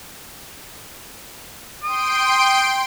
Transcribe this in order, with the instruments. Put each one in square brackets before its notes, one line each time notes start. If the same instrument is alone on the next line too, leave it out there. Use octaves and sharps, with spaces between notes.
[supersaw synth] G5 C6 D7 [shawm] D#6